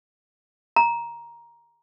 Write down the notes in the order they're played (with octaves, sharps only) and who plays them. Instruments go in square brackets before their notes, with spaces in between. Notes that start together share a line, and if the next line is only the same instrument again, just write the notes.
[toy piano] A#5